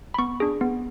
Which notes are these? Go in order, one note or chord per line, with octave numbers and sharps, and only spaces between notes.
B5
B3 C#6
D4 G#4
B3